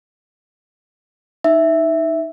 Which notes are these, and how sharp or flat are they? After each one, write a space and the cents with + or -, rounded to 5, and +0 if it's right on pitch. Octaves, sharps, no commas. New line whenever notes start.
D#4 +0 E5 +0